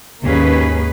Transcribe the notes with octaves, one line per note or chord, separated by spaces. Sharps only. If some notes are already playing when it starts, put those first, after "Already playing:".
D#2 G#2 A#3 C#4 G#4 B4